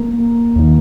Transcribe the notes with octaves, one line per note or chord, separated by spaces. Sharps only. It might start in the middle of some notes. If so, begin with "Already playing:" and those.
Already playing: A#3
D#2 D#3